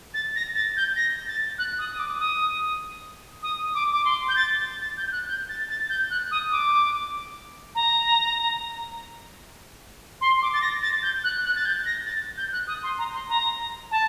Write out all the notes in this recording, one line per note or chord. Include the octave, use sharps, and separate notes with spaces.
A6
A#6
A6
G6
A#6
A6
F#6
D#6
D#6
D6
D#6
D#6
D6
D6
C6
G6
A6
A6
G6
F#6
G6
A6
A6
G6
F#6
D#6
D6
A#5
C6
D6
A6
A#6
A6
G6
F#6
F#6
A6
G6
A#6
A6
G6
F#6
D#6
C6
A#5
C6
A#5
A5